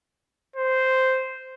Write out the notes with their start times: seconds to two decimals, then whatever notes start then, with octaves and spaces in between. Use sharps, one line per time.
0.56 C5